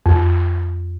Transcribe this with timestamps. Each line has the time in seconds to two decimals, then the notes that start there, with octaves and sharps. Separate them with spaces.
0.06 F2